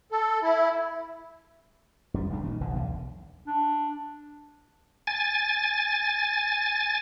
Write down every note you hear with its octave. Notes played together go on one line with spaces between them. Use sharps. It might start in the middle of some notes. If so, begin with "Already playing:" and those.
A4
E4
F#2 G3
G1 C2 G#2 D4
A#2 D#3
F1 C2 B2 D3
B1 E2 D3
D4
G#5 A6